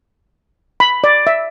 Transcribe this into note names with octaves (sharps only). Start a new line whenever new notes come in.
B5
D5
E5